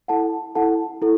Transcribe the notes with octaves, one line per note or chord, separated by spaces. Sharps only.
E4 A4 F#5 A5
E4 A4 F#5 A5
E4 A4